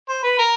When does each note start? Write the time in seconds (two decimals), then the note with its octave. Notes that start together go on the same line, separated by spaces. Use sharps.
0.09 C5
0.23 B4
0.39 A#4